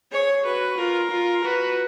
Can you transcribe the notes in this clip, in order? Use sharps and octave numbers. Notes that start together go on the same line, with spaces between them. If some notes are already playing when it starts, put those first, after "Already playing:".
G#4 C#5
F#4 B4
F4 A#4
F4
F#4 B4